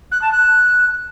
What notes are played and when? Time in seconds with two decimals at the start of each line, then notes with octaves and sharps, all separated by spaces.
0.11 F#6
0.21 A5
0.31 F#6